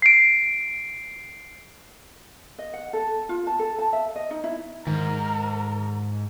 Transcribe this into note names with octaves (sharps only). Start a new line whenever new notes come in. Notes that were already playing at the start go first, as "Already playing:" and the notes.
C7 D7
D#5
F#5
A4
F4
A5
A4
A5
E5
D#5
D#4
E4
G#2 D#3 A#4